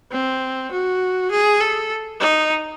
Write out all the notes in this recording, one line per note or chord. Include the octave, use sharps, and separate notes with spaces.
C4
F#4
G#4
A4
D#4